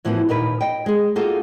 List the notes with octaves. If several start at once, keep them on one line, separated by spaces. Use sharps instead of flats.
A2 E3 F3 A#3 B3 F#4
D#2 A#2 D#4 A#4 B4
D#5 G5
G#3 G#4
A#3 D#4 F4 F#4 G#4 A4